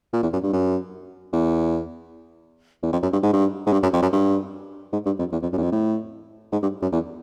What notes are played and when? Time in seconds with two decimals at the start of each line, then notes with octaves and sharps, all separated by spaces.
0.13 A#2
0.23 E2
0.33 F#2
0.43 G2
0.53 F#2
1.33 E2
2.83 E2
2.92 F2
3.03 F#2
3.13 G2
3.23 G#2
3.33 G2
3.67 G#2
3.73 G2
3.83 F#2
3.93 F2
4.02 F#2
4.13 G2
4.93 G#2
5.06 G2
5.19 F2
5.32 E2
5.42 F2
5.53 F#2
5.58 E2
5.62 F2
5.72 A2
6.52 G#2
6.62 G2
6.82 F#2
6.92 E2